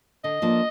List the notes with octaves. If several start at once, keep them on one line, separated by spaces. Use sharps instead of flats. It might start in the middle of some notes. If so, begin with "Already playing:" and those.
D3 D#5
F3 A#3 D4